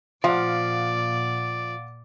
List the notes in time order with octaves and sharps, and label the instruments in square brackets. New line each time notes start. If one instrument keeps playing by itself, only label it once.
[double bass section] A#2 [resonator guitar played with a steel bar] F3 [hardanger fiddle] D5 [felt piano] F5 F#5